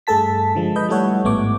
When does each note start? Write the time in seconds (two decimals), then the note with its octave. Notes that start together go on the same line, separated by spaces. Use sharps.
0.07 G2 A3 G#4 A4 A5 B6
0.55 D3 F3 G#3
0.76 B4 D#5 G6
0.89 G3 A3 E4 A4 C#5 F#5
1.24 A1 G#2 A3 B3 C#5 D6